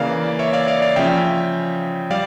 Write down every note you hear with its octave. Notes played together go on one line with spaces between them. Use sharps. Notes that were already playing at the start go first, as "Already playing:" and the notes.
Already playing: C#3 E3 A#3 D5 F5
C#5 E5
D5 F5
D5 F5
D5 F5
C#3 F3 C#4 E5 G5
G3 D5 F5